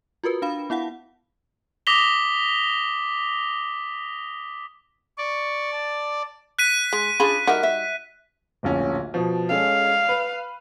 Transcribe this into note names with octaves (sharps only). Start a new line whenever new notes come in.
F4 F#4 A#4 B4
D4 F5 B5
B3 E4 F5 F#5
D6 D#6 A#6 B6 F7 G7
D5 C#6
A5
F#6 B6 D#7
G#3
C#3 D4 F4 G#4 B5
G3 D#4 F#4 A#4 E5
E5
D1 A#1 C#4
B2 F3
G#3 C#4 A4 F5
B4